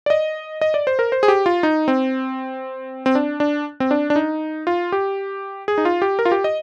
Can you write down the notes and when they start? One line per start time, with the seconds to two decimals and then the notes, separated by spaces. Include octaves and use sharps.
0.06 D5
0.10 D#5
0.61 D#5
0.74 D5
0.87 C5
0.99 A#4
1.12 C5
1.23 G#4
1.28 G4
1.46 F4
1.63 D#4
1.88 C4
3.06 C4
3.15 D4
3.40 D4
3.80 C4
3.91 D4
4.10 D4
4.16 D#4
4.67 F4
4.92 G4
5.68 G#4
5.78 D#4
5.85 F4
6.02 G4
6.19 A#4
6.25 F4
6.32 G4
6.44 D#5